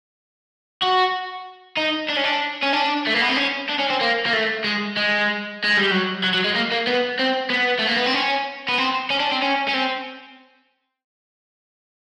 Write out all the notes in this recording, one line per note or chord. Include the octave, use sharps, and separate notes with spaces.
F#4
D#4
D4
C#4
D4
C#4
D4
A3
A#3
B3
C4
C#4
D4
C#4
C4
A#3
A#3
A3
G#3
G#3
G#3
G3
F#3
F#3
F#3
G#3
A#3
A#3
B3
C4
B3
A3
A#3
B3
C4
C#4
B3
C4
C#4
D4
C4
C#4
C#4
C4